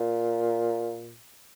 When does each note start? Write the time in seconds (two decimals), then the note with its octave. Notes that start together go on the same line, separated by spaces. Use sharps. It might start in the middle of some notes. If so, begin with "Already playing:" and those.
Already playing: A#2